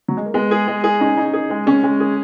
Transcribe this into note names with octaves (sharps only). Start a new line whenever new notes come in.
F#3
G#3
A#3
G#3 B3
G#4
G#3
G#4
C#4 D#4
D#4
G#4
G#3
G#3 C#4
G#3
G#4